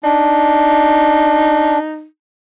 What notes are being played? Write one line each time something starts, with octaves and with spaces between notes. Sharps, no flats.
D4 D#4